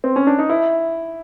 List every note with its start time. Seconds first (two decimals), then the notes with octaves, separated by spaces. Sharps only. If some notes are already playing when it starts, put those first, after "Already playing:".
0.04 C4
0.16 C#4
0.27 D4
0.39 D#4
0.49 E4